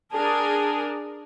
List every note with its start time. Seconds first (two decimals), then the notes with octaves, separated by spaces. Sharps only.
0.12 D4 G#4 A#4 A5